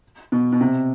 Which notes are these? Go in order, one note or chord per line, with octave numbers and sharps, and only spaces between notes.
B2
B2
C3